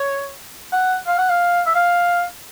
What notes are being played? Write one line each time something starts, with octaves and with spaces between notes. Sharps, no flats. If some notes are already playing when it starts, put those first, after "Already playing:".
Already playing: C#5
F#5
F5
F#5
F5
E5
F5